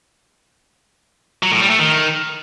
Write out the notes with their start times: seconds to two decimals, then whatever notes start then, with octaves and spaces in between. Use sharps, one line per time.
1.43 F#3
1.52 A2
1.61 G3
1.70 A3
1.79 D#3